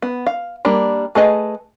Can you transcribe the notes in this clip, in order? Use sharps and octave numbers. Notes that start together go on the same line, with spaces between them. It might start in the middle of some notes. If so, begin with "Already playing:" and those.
B3
F5
G3 A#3 D4
A3 G#4 B4 D#5